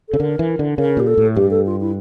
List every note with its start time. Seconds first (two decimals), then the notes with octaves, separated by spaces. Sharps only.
0.09 C#3 A4
0.20 D3 A#4
0.39 E3
0.59 D3
0.78 C#3 A#4
0.97 A#2 G4
1.07 A4
1.18 A2
1.36 G2 G4
1.51 A4
1.66 F4
1.81 E4